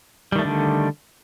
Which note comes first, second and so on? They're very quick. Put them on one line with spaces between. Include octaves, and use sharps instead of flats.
G3 D#3 A3 D4 D3